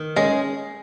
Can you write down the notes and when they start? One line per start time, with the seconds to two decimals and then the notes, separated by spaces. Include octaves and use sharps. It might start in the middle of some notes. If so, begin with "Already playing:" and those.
Already playing: D#3
0.16 G#3 C#4 G#4